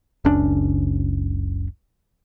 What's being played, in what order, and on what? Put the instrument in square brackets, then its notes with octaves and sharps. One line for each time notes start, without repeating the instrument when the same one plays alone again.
[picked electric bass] F#1 C#2 C#4 D4